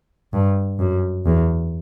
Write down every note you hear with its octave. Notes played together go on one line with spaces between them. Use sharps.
G2
F#2
E2